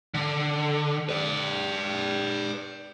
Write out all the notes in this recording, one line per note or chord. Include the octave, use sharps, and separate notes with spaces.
D3
B4 D5